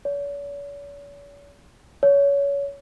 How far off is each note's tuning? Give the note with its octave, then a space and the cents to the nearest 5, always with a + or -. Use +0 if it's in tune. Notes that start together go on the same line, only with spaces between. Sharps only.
C#5 +45
C#5 +25